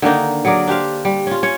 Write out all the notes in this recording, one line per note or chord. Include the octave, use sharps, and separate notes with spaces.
D3 D#3 A#3 D#4
F#3 G#4 A#4 D5
D4 G4 C5 F5
G3
C#4 F4
C#4 C#5